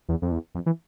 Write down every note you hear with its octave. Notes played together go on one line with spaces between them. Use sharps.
E2
F2
E2
F2
E3